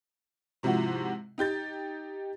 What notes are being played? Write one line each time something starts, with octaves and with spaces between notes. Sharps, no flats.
G#2 C3 F3 E4 F#4
D#4 G4 G6 A6